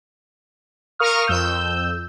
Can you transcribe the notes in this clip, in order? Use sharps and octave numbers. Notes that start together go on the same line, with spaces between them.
A#4 F5 C#6 D#6 F6
F2 E6 G6